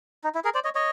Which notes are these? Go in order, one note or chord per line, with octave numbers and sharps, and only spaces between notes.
D#4
E4
G#4 A#4
C5 D5
C#5 D#5
C#5 D#5